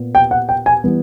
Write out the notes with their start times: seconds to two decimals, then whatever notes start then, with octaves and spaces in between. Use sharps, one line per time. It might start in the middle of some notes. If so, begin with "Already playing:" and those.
Already playing: A#2 B3
0.15 G5
0.31 F#5
0.49 G5
0.66 G#5
0.84 E3 G3 B3